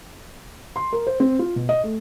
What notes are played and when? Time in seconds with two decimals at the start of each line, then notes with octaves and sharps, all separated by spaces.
0.76 C6
0.93 A#4
1.07 C5
1.20 C4
1.39 F4
1.56 B2
1.69 D#5
1.83 A3